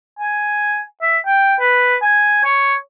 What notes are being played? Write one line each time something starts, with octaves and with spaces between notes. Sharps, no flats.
G#5
E5
G5
B4
G#5
C#5